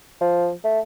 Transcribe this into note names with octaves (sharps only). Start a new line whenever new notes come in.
F3
A3